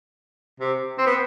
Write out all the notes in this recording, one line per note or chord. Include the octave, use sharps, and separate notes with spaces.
C3
C4
B3